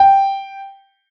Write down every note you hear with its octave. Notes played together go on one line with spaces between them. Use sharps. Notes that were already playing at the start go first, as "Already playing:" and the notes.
Already playing: G5